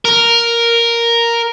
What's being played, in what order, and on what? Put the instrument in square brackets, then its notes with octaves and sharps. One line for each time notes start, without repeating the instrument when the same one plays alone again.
[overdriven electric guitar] A#4